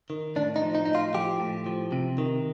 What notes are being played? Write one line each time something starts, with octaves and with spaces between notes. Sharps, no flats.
D#3
A2 D4
D#4
F3
D#4
A2 D#4
F4
F3 G4
A2
F3
C3
D#3